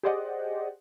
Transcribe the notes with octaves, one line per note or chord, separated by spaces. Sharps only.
G4 G#4 C5 D5 D#5 F#5